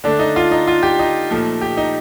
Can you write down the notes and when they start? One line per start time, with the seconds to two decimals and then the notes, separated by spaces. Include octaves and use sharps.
0.04 D3 A3 D4
0.19 D#4
0.36 F4
0.51 D#4
0.68 F4
0.83 G4
0.99 D#4
1.31 A#2 F3 A3
1.61 G4
1.77 D#4